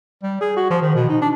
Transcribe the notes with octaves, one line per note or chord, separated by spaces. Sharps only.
G3
G#4
F#4
F3
D#3
B2
D#4
D4